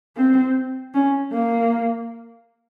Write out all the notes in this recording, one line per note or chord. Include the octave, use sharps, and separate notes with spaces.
C4
C#4
A#3